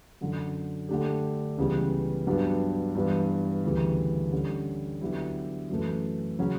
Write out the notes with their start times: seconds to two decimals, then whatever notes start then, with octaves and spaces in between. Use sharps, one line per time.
0.21 F#2 D3 F#3
0.89 D3 A3 D4 G4
1.57 C#2 C#3 E3 G3 B3
2.27 G2 F#3 B3 D4 G4
2.95 G2 E3 B3
3.64 D2 C#3 E3 G3
4.32 D3 G3 C#4
5.01 D3 F#3 B3 E4 G4
5.70 F#2 E3 A3
6.39 C#3 F#3 C#4